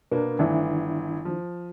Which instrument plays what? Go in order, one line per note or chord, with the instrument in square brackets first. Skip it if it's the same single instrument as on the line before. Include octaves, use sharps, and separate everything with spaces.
[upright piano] B2 A#3 B3 [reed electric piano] D4 A#4
[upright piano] G1 E3 A3 [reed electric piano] D#3 D4 E4
[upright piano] F3